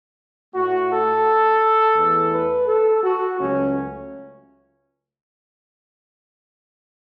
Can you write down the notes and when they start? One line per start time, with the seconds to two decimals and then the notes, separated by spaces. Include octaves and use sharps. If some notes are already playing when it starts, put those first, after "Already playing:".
0.54 A2 A3 F#4
0.91 A4
1.96 E2 E3 A3
2.33 B4
2.67 A4
3.03 F#4
3.38 C#2 C#3 F#3 A3 C#4